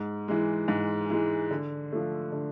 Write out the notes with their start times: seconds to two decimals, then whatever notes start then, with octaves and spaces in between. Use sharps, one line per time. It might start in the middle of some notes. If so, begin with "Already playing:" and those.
Already playing: G#2
0.28 E3 G#3
0.68 G#2
1.10 E3 G#3
1.51 D3
1.92 F3 A3
2.32 D3